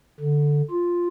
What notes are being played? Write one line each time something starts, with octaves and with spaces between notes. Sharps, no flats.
D3
F4